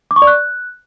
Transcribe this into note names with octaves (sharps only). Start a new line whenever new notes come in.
D6
C#6
D5
F#6